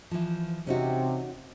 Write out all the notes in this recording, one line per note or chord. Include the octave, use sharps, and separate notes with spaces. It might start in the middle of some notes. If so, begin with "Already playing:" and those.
E3 F3
C3 C#4 D#4 F#4